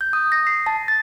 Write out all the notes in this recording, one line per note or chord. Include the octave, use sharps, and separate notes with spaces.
G6
D#6
A#6
C7
A5
A6